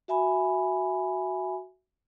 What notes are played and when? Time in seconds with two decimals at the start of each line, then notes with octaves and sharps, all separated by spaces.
0.08 F#4 E5 G#5 B5